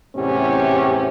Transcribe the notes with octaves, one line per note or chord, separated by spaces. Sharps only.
E2 A2 C3 C#4 G4